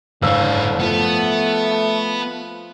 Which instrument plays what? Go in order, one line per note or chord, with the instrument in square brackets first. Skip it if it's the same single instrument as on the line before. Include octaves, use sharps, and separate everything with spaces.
[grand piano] F#1 F5 E6 [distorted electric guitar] G#2 C#5 [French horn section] D3
[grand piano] F3 [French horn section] A3 [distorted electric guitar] B3